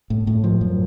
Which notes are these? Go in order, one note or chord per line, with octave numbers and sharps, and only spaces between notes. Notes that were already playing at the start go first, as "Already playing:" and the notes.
A2
A2
F3
F#2